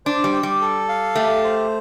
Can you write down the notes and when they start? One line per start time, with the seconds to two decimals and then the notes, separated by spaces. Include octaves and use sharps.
0.06 D4 C5
0.24 G3
0.33 G5
0.43 G3
0.61 A4
0.89 F5
1.15 A3 G4
1.44 C5